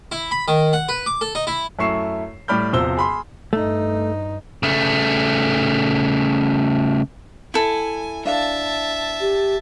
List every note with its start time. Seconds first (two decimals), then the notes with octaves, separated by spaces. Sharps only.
0.12 E4
0.31 B5
0.48 D#3
0.73 F#5
0.89 B4
1.06 D6
1.21 A4
1.35 D#4
1.47 E4
1.79 F#2 A3 E4 C#6 C7 E7
2.48 A2 G3 D5 B5 F6 G6
2.73 E1 C3 F3 C5 E6 G7
2.97 G#4 B5 C6
3.53 G2 A3 D#4
4.63 C#3 A3
7.54 E4 A4 G#5
8.25 D4 E5 F5 A5
9.21 G4